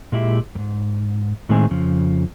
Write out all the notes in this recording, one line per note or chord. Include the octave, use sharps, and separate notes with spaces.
A#2 G#3 E4 G4 E5
F2 G#2
A2 D#3 G#3 C4 G#5
F2 C#3 F3